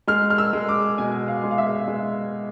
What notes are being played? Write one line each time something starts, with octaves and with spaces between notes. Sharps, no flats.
G#3 F6
F6
E6
G#3
D6
B2 G#5
F5
G#3
F5
E5
G#3